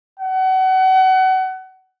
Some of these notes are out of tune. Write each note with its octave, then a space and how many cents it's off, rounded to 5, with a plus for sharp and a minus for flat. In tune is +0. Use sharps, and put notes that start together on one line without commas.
F#5 +30